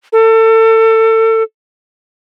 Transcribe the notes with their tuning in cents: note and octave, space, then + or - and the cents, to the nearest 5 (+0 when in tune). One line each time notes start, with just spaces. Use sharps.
A4 +30